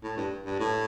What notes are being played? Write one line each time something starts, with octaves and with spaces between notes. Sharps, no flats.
A2
G2
G2
A2